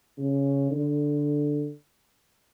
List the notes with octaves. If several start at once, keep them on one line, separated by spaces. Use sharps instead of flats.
C#3
D3